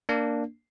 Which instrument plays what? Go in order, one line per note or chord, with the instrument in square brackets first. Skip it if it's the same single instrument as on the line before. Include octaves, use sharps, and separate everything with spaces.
[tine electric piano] A#3 D4